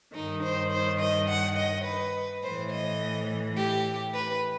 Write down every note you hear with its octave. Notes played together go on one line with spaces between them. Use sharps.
G2 D#3 D#4
C5
C5
D#5
F#5
D#5
B4
A2 E3 C5
D#5
G4
B4